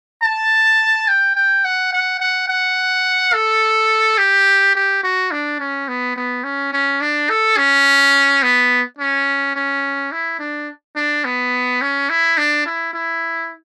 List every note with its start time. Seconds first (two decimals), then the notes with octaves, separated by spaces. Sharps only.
0.23 A5
1.08 G5
1.35 G5
1.65 F#5
1.93 F#5
2.20 F#5
2.48 F#5
3.33 A4
4.18 G4
4.75 G4
5.03 F#4
5.31 D4
5.60 C#4
5.88 B3
6.16 B3
6.44 C#4
6.73 C#4
7.01 D4
7.30 A4
7.57 C#4
8.43 B3
8.99 C#4
9.56 C#4
10.12 E4
10.39 D4
10.96 D4
11.25 B3
11.81 C#4
12.10 E4
12.38 D4
12.66 E4
12.94 E4